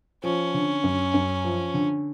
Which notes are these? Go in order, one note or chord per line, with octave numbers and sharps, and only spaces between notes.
F3 C#4
D3
F#2
F#2
F3
D3